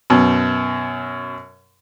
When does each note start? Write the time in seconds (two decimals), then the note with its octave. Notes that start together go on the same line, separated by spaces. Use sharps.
0.10 F#2 B2